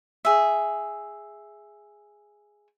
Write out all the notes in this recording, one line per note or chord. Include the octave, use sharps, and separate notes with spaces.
G#4 E5